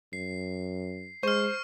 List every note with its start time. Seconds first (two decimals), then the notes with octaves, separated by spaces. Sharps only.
0.13 F#2 C7
1.23 G#3 C5 C#6 F6